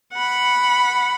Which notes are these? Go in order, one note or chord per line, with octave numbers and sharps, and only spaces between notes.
F#5 B5